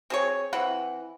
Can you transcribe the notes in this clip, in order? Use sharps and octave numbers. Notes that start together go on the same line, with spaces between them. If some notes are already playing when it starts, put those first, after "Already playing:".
C4 G#4 C#5
E3 C4 F#5